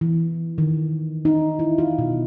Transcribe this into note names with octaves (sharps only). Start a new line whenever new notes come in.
E3
D#3
D#4
E4
F4
B2